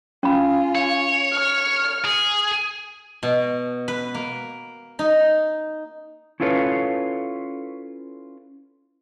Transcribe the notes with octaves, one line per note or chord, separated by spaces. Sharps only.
C#4 F4 G#5 B5
C#5
F6
G#4
B2
B4
A#3
D#4
C#4 E4 F4 A4 B4 C#5